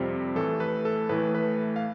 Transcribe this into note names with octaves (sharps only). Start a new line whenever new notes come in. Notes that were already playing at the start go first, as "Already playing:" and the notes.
Already playing: F2 C3 G3 C4 F4
A2 E3 A3 A4
B4
A4
A2 E3 A3 B4
B4
F5